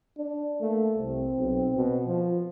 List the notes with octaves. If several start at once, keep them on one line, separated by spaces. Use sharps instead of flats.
D4
A3 A#3
C2 C4
B1
B2
F3